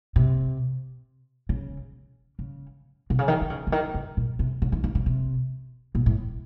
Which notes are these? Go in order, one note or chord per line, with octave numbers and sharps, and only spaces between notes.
C3
C#3
C#3
C3
C#3
D#3
D#3
C#3
C#3
D#3
C#3
A#2
C3
C#3
D#3
D#3
C#3
C3
A#2
A2